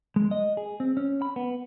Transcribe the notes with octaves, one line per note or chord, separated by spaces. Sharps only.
G#3
D#5
G#4
C4
C#4
B5
B3